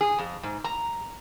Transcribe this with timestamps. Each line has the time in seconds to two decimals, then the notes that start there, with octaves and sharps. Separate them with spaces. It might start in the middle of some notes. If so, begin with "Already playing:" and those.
0.01 G#4
0.18 F2
0.43 G#2
0.64 A#5